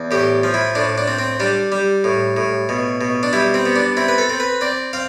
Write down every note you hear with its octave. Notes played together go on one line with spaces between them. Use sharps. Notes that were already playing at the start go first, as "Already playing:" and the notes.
Already playing: E2
A2 G4
F3
E4
A2 D4
D4
C4
C4
G3 D4
G3
A2
A2
B2
B2
D4
G3 E4
C4
B3
D4
C4 E4
B4
A4
C4
B4
C4 D5
C4 F5